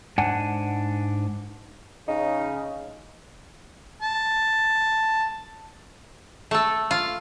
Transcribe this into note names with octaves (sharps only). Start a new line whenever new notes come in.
G#2 D4 F#5 G#5 A5
C#3 D#4
A5
A3 A4
F4